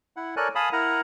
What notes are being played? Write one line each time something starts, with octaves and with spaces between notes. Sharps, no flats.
E4 F#5
A4 A#4 C#5 D5 G#5 F#6
F5 G#5 A5 B5 D#6
E4 A#4 F#5 A#5